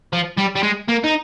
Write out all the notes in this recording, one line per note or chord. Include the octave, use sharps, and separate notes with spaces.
F3
G3
G3
G#3
A#3
D#4